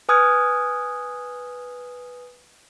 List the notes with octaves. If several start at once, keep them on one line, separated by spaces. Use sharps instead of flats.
B4 G#5 D#6 F6 F#6 G#6